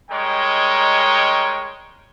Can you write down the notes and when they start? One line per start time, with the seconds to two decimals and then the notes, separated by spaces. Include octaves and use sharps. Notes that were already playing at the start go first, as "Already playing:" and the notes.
0.11 G3 G#3 D#4 A#4 C#5 G5